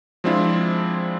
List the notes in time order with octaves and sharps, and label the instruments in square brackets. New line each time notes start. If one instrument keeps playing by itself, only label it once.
[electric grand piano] F3 G#3 C4 D4 E4 F4